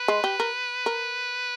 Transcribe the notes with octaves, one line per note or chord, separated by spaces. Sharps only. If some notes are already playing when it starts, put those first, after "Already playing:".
Already playing: B4
G#3
G4
A#4
A#4